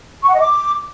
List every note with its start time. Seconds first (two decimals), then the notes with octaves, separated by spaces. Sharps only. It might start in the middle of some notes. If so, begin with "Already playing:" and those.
0.23 C#6
0.29 F#5
0.35 D#5
0.40 D6